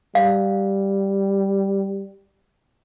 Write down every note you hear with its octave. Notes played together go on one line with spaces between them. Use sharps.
G3 F5